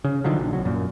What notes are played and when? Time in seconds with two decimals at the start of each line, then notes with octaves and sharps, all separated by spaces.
0.04 C#3
0.24 D3 D#3 F3 F#3
0.39 A#1
0.53 C2 F#3
0.65 F#2 A#2